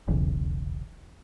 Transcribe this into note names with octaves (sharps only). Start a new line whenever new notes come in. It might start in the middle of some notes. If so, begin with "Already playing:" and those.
D#1 B1 E2 C#3